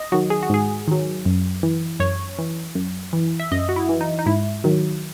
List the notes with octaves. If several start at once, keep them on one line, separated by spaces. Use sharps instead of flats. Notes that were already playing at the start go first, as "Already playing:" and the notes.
Already playing: D#5
D#3 F#3 F#4
G#4
F#4
G#2 G#4
D#3 F#3
F#2
E3
F#2 C#5
E3
F#2
E3
E5
F#2 D#5
F#4
E4
E3
D#4
D#4
G#2 E4
D#3 F#3